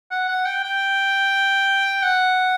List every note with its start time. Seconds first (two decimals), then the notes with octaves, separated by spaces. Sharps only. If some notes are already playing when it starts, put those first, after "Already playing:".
0.11 F#5
0.28 F#5
0.46 G5
0.63 G5
2.03 F#5